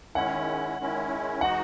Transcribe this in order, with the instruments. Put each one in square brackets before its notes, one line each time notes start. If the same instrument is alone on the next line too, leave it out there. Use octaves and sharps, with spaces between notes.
[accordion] D#3 G#3 C#4 E4 [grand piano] F#5
[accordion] D#3 G#3 C#4 E4
[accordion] E3 G#3 D#4 F#4 [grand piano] F#5